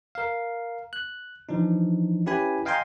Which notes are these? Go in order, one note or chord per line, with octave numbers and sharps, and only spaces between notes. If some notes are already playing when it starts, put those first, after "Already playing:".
A#4 F5
F#6
E3 F3 D4 D#4
C#4 E4 G4 B4 G#5 B5
D#5 F5 G5 G#5 A#5 C6